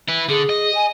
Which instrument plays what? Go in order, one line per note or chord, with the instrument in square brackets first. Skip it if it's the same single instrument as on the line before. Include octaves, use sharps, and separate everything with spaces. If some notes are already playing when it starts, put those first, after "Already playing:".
[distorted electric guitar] E4 B4
[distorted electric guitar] D3 [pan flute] G#4
[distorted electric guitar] D#5
[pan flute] G#5